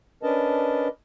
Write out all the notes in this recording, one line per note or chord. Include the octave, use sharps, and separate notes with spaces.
C#4 D4 A#4 B4 D#5 A5